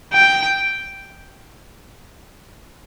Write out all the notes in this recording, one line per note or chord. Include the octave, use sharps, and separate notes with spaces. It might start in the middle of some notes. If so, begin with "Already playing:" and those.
G5